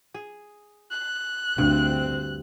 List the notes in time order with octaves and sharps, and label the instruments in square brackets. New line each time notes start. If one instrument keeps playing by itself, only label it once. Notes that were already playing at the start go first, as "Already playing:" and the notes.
[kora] G#4
[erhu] F#6
[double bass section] D2 C4 [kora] G2